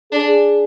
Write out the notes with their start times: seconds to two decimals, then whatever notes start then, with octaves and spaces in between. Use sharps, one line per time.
0.12 D4 G#4